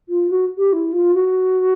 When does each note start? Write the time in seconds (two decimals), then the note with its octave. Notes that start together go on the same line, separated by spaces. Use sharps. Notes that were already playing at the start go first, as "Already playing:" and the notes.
0.09 F4
0.30 F#4
0.58 G4
0.73 E4
0.93 F4
1.14 F#4